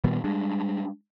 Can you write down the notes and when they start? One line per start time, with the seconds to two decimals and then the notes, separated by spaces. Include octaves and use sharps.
0.04 A#2 D#3 G3 B3
0.24 G3 G#3 D4